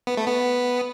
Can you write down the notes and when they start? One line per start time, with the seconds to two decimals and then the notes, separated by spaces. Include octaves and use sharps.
0.07 B3
0.17 A3
0.27 B3